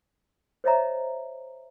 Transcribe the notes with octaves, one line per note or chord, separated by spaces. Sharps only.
C5 C#5 D#5 E5 A#5